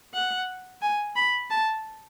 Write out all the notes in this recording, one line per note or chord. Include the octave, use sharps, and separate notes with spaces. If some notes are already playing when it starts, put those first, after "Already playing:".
F#5
G#5
B5
A5